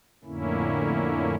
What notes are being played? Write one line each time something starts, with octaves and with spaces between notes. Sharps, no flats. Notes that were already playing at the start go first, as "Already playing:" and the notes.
F2 A2 D3 A#3 C#4 E4